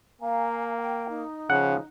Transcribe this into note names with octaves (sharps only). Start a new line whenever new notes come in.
A#3 F5 G#5 A#5
G5
D#4
C#3 F3 F#5